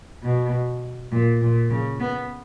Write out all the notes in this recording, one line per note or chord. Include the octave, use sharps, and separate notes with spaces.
B2
A#2
A#2
C#3
B3